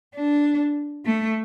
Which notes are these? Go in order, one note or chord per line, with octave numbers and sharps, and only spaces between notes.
D4
A3